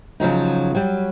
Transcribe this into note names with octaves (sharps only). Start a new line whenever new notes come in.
C#3 F3 F#3 D#4
F#3 G3